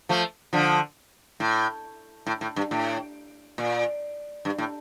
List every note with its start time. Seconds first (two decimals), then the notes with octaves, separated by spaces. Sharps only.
0.09 F3 A3
0.53 D3 F3
1.40 A2
2.27 A2
2.41 A2
2.56 G2
2.71 A2
3.58 A#2
4.45 G2
4.58 A2